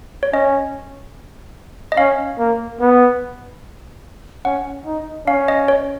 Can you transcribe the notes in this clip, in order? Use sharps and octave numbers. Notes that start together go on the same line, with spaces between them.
C#5
C#4 D#5
D#5
C#4 F5
A#3
B3
C#4 F#5
D#4
C#4 F5
D#5
C#5